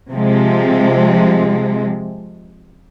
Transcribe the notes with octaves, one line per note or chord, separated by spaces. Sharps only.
C3 F3 G#3